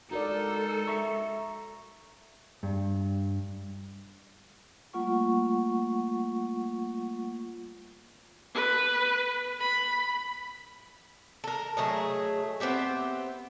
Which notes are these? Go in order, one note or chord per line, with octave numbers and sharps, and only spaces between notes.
G#3 D#4 F#4 A4 A#4 D5
E5 A#5 C#6
G2
G3 A3 A#3 F4 F#5 C#6
B4
B5
A4 A#4
F#3 A3 G#4 D#5
B3 C4 G4 E5